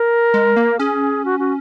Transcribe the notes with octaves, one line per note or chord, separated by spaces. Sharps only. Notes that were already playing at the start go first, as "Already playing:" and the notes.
Already playing: A#4
G#3
A#3
C#4 G#4
F#4
F#4